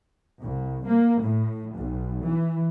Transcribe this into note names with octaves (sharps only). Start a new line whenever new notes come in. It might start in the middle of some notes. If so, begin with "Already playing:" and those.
C2
A#3
A2
B1
E3